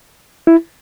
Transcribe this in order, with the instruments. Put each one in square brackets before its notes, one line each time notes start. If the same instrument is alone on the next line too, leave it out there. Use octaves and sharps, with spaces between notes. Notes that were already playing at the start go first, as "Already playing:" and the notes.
[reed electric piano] E4